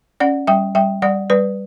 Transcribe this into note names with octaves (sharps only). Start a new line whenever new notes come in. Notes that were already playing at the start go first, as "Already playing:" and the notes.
C#4 D5 F#5
G3 E5 G5
G3 E5 G5
G3 D5 F#5
G3 B4 D5